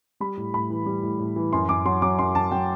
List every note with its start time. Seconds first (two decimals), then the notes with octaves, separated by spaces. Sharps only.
0.20 G3 B5
0.37 A2
0.54 A2 B5
0.70 E3
0.86 G3
1.03 A2
1.19 A2
1.36 E3
1.53 F#2 C6
1.69 F#2 D6
1.85 F#3 C6
2.02 F#3 D6
2.18 F#2 C6
2.35 F#2 A5
2.51 F#3 G5